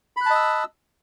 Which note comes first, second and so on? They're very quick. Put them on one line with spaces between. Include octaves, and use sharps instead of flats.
B5 F#6 A5 D#5 E6